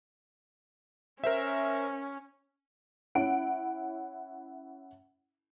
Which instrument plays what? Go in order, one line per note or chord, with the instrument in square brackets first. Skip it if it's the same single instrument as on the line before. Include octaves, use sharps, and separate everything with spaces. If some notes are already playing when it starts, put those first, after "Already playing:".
[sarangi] C#4 [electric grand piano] A#4 C5 E5
[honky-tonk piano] C#4 E4 F#5 D7